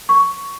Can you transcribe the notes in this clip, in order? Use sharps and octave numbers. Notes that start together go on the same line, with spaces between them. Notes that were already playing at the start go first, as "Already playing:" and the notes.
C#6